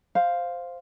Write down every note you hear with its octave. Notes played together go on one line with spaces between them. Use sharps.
C5 F5